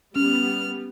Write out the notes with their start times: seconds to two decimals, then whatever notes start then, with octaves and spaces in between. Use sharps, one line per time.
0.16 G3 B3 C#4 F6